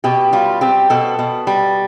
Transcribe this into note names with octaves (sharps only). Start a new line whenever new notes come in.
B2 G4
G3 F4
C4 G4
B2 A4
B2
G3